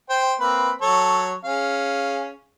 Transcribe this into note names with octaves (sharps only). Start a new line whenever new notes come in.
C5 G5
A#3 C4 B4
F#3 A4 C#5
C#4 G#4 F5